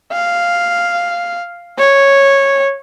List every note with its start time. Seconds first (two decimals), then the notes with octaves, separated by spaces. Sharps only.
0.12 F5
1.78 C#5